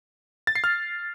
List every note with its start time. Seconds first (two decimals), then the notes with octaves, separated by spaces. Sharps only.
0.47 A6
0.55 C7
0.64 F6